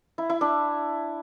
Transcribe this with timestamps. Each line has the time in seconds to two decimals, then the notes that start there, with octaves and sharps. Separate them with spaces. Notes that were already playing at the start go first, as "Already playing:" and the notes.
0.18 E4
0.29 E4
0.41 D4